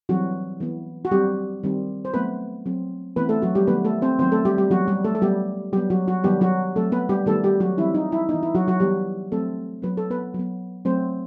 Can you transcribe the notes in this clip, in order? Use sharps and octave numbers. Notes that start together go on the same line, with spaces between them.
E3 F#3 G3 C4 F#4
E3 B3
F#4
F#3 G3 C4 G4
D#3 G3 C4
C5
F#3 A3 B3 C4 B4
F#3 C4
E3 A3 B3 C4 B4
A3 A4
F#3 F#4
G3 G4
D#3 F#3 A3 B3 B4
A3 A4
C4 C5
D#3 F#3 B3 C4 C5
A3 A4
G3 G4
G3 G4
E3 F#3 B3 F#4
G3 G4
A3 A4
A4
F#3 G3 B3 G4
F#3 G3 B3 G4
F#3 F#4
F#3 F#4
D#3 F#3 G3 B3 G4
F#3 F#4
F#3 A3 C4 A4
B3 B4
G3 G4
D#3 G3 A3 B3 A4
G3 G4
F#3 F#4
E3 G3 C4 E4
D#4
E4
E3 B3 D#4
E4
F#3 F#4
F#3 F#4
E3 G3 B3 G4
F#3 A3 C4 A4
F#3 B3 B4
A4
B3 B4
F#3 B3
F#3 A3 C4 C5